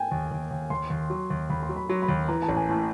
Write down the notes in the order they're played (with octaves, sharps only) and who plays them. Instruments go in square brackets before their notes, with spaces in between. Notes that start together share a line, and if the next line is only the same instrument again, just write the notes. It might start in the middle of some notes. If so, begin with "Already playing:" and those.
Already playing: [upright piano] G5 G#5
[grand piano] D#2
D#2
D#2
[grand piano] D#2 [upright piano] C6
[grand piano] D#2
F#3
D#2
[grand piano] D#2 [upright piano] B5
[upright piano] C6
[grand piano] F#3
[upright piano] B5
[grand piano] F#3 [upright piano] C6
[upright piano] B5
[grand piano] D#2
[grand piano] E3 [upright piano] A#5
[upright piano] A5
[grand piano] A1
[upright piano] G#5
[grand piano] A2 [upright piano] A5